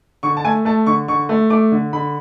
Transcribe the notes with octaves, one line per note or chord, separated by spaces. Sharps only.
D3 C#6
A5
A3 G#5
A3 A5
D3 C#6
D3 C#6
A3
A3 D6
D3
D3 B5